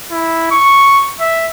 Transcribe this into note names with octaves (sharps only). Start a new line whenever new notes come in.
E4
C#6
E5